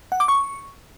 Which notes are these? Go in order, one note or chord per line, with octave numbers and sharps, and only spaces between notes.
F#5
D6
C#6